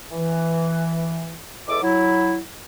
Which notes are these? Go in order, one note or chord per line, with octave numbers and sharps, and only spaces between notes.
E3
E2 E3 A4 D#5 D6
F#3 E4